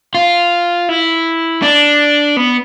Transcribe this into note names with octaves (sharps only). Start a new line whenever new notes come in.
F4
E4
D4
B3